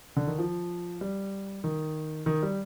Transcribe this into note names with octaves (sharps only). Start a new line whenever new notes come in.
D3
D#3
F3
G3
D#3
D#3
G3